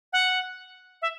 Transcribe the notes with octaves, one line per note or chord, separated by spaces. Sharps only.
F#5
E5